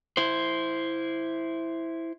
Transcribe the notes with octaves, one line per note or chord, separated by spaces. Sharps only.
E4 C5